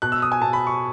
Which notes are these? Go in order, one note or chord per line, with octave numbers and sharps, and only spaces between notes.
B2 F#6
E6
D#6
G#5
B2 A5
B5
C#6